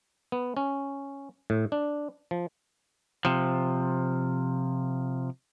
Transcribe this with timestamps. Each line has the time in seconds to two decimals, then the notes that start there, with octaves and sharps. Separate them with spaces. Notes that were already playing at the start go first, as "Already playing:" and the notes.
0.32 B3
0.57 C#4
1.50 A2
1.72 D4
2.31 F3
3.25 C3 F3